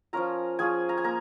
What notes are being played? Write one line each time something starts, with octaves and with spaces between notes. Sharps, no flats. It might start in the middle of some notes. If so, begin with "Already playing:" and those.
F3 C#4 F4 A#4 A#5
F3 C#4 F4 G#4 G#5
A#5
G#5
A#3 A#5